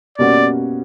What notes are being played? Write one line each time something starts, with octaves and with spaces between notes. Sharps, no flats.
B2 G3 A#3 C#4 F#4 D5